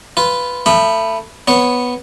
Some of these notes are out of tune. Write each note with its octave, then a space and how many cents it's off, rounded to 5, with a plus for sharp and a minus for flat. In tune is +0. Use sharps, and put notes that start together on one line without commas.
F4 -15 B4 +0
A3 +25 B5 +0 D#6 -35
B3 +0 C#5 -5